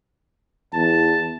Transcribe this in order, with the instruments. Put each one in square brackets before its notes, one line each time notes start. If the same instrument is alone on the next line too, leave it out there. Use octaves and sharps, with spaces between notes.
[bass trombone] E2 [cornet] A5